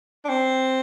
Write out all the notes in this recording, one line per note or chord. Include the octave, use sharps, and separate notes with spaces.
D4
C4